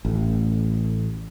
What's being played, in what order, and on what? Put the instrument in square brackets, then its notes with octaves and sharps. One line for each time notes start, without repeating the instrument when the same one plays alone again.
[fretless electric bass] A1